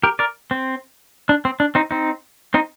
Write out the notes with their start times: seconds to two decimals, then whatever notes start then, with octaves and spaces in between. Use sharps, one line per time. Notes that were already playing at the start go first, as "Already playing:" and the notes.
0.03 G4 A#4
0.19 A#4 D5
0.51 C4
1.29 D4
1.45 C4
1.60 D4
1.75 C4 D#4
1.91 C4 D#4
2.54 C4 D#4